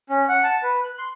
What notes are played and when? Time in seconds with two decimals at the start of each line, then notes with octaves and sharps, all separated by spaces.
0.09 C#4
0.29 F#5
0.44 A5
0.63 B4
0.84 F#6
0.98 C6